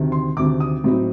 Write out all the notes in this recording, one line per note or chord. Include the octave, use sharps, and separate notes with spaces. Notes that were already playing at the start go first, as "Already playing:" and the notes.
Already playing: D2 C3 D#3
C6
D2 C3 D#3 D6
D#6
A2 F#3 C4 D#4